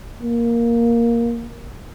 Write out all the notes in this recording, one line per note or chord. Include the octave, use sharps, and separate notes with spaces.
A#3